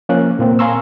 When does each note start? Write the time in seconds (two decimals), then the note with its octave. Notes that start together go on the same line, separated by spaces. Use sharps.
0.09 F3 A#3 C#4 F#6
0.39 A#2 A#3 C4
0.59 F5 G#5 A#5 C6 C#6 E6